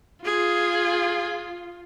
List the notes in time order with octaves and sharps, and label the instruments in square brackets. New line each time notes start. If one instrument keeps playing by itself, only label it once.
[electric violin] F4 [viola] G#4